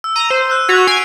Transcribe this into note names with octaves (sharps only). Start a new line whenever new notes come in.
E6
A#5 D#7
C5
E6 F#6
F#4 G#6 B6 F7
G#5 C7 D7